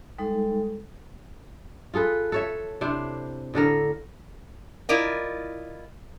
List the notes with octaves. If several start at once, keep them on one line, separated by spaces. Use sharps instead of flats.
G3 G#3 D#4 A4
F4 G#4 A4 B4
A4 C#5 E5
C3 D4 E4 C5
A2 D3 A4 A#4
E4 F4 A#4 D5 D#5